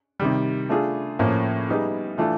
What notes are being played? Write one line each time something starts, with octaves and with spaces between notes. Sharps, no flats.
C3 D#3 G3
A3 D4 F4 G#4
A2 F3 A#3 C#4
G3 B3 D#4 G#4
E3 A3 D4 F4